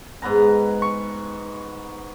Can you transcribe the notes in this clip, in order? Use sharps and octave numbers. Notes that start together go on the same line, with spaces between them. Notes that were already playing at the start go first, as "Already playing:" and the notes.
G#2 B3 B4 A#5
C#6